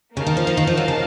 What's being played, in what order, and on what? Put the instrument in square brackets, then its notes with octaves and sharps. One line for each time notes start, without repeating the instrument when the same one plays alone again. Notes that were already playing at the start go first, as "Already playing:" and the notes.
[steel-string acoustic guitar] C#3 [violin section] A#3 D#4 A#4 F5 A5
[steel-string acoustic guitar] D#3
F3
F3
D#3
F3
F#3
C#3